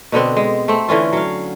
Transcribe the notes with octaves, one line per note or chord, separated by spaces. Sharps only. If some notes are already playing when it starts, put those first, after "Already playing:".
B2 D3 B3 C4
G#3
A3 C4
D3 E3 C#4 F4
F#3 F5